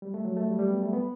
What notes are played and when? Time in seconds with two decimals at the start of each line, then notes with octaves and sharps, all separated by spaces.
0.02 G3
0.14 A3
0.25 F#3
0.37 A3
0.47 G3
0.59 G3
0.70 B3
0.82 A3
0.93 B3